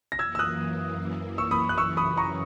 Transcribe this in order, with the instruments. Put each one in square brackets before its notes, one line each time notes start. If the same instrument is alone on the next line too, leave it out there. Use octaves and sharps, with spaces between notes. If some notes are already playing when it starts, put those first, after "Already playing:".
[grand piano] A#6
[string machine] F#2 E3 A#3 [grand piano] E6 G#6
[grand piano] E6
D#6 F#6
C#6 E6
B5 D#6
F#6
[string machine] F#2 C#3 E3 [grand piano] C#6 E6
[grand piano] B5 D#6
A#5 C#6